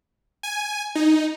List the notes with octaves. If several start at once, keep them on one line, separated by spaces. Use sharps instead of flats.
G#5
D#4